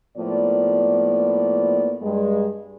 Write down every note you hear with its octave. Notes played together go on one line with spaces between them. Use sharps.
A2 F3 A#3 B3 D5
G2 G#3